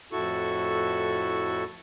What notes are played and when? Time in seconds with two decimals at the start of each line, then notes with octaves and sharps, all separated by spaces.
0.12 F2 A2 E4 F#4 A4 C#6